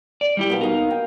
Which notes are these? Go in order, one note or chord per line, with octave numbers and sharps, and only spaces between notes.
D5
G3 E4 G4
B2 A#3 B3
D#4 A#4 F5
G5